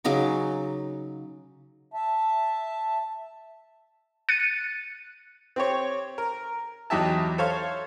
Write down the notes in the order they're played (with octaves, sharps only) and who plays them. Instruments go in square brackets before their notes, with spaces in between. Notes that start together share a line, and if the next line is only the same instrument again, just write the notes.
[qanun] C#3 F#3 D#4 D6
[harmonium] E5 A5
[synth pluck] F#6 A6 C#7 D#7
[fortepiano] C4 G4 C#5
A#4
E2 F#3 D#4 G4 E5 A5
A4 C5 C#5 F5